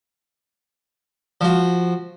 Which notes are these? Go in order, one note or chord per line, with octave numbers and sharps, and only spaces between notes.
F3 F#4